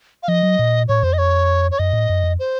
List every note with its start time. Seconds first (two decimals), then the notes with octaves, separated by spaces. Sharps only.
0.23 F5
0.28 F3 D#5
0.43 F#3
0.59 A#2
0.88 A2 C#5
1.03 F2 C5
1.13 D#5
1.18 C#5
1.71 C#5
1.79 F#2 D#5
1.93 A2
2.09 F#2
2.24 F2
2.39 C5